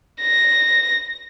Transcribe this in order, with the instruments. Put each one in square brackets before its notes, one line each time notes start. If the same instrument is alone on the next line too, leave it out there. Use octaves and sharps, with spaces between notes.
[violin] A#6